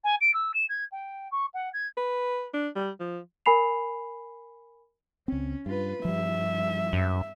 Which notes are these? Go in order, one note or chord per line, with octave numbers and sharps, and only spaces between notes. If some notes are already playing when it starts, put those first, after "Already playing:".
G#5
D7
E6
E7
G#6
G5
C#6
F#5
G#6
B4
D4
G3
F3
A#4 G#5 B5 C7 F7
C#2 C4 C#4
G2 F4 B4
G2 F3 G3 E5
F#2